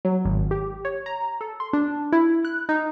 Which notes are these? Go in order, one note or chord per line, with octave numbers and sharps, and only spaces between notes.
F#3
G#1
G4
C#5
A#5
A4
C6
D4
E4
F#6
D#4